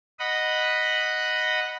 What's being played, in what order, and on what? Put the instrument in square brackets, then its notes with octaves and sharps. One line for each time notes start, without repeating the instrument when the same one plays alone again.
[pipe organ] D#5 F#5 B5